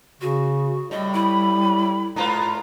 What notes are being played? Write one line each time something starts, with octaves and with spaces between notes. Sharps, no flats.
C#3 F#4
A2 G3 D#5
E4 B5
G#2 F4 B4 A#5